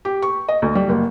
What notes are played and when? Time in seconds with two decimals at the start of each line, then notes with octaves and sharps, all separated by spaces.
0.05 G4
0.22 C#6
0.49 D#5
0.62 D2
0.75 G3
0.89 F#1